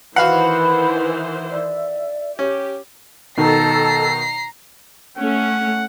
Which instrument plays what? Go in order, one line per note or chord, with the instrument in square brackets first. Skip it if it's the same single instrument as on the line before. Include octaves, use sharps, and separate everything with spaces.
[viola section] D#3 E3 C5 [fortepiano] F#4 F5 F#5 [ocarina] B4 [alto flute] B5
[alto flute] E5
[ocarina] D5
[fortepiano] C#4 [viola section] G4
[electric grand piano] B2 D#3 D#4 [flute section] A4 [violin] A#5 C7
[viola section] A3 C#4 [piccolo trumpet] F#5